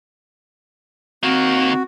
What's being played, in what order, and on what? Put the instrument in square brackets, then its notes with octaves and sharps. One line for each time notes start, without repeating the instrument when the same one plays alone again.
[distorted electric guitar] D#3 A#3 [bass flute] C4 [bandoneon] F#4